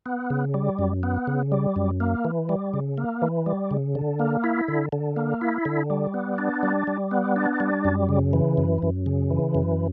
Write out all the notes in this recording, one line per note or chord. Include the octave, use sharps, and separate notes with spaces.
B3
C#3
G3
F#2
B3
C#3
G3
F#2
A#3
E3
G3
C#3
A#3
E3
G3
C#3
D3
A#3
E4
D3
D3
A#3
E4
D3
G3
B3
D4
G3
G3
B3
D4
G3
F#2
C#3
E3
F#2
F#2
C#3
E3
F#2